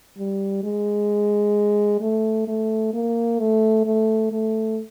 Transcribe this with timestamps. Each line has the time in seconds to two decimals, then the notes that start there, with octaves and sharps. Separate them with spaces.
0.18 G3
0.64 G#3
2.01 A3
2.48 A3
2.94 A#3
3.40 A3
3.86 A3
4.32 A3